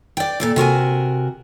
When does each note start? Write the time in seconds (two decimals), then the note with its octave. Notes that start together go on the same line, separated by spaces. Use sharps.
0.17 D5 G5
0.40 A#2 A4 D5
0.56 C3 F#4 A#4 G#5